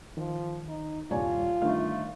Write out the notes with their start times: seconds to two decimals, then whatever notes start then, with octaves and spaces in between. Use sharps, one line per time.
0.17 D#3 F3
0.68 D#4
1.11 D#1 C2 G2 F4 C#5 D5 G#5
1.62 G1 D3 D#3 A3 F5